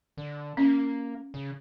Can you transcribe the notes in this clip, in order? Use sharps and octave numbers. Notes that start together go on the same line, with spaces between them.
D3
A#3 C#4
C#3